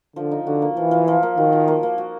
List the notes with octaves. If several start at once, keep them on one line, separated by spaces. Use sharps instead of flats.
D3 F3
D#4
D3 F#4
A#3
E3 F3
F3
F3
A#3
D#3 F#4
F3
A#3
A#3
F#4